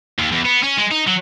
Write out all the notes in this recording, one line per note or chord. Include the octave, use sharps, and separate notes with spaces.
D#2
E2
B3
C#4
G#3
D#4
F#3